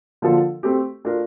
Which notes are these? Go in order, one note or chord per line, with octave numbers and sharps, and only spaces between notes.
D3 F3 A#3 F4 A4
A3 C4 G4
A3 D4 F4 A#4